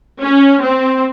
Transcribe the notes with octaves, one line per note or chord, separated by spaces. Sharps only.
C#4
C4